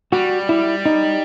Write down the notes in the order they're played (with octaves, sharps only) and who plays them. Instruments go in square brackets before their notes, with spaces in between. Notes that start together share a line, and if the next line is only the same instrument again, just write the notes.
[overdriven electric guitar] G3 [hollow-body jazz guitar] F#4
[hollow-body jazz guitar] E4
D#4